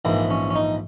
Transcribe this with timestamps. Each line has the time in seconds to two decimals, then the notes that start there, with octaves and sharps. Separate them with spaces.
0.05 A#1 G#2 E3 A#3
0.30 C#4
0.50 C#4
0.55 D#4